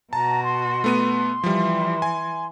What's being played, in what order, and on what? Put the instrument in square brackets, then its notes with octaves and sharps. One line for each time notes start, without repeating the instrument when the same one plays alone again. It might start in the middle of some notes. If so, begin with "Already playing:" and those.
[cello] B2 F#4 [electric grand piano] A5 [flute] A#5
[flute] C6
[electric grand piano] A3 B3 D#7
[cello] E3 [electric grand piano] F3 G3
[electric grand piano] G#5